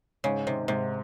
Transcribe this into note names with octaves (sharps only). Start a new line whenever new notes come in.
G#2 C#3
C3 D#3
G#2 C3